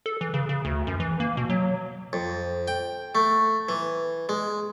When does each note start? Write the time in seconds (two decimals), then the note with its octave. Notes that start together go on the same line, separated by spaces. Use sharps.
0.06 A4
0.21 E3
0.34 C#3
0.49 C#3
0.65 D2
0.87 F#2
1.00 E3
1.20 A#3
1.37 B2
1.49 F#3
2.13 F2
2.68 G5
3.15 A3
3.69 E3
4.29 G#3